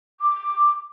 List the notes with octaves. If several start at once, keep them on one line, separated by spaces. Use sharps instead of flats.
D6